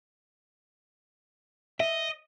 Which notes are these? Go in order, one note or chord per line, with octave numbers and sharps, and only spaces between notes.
D#5 E5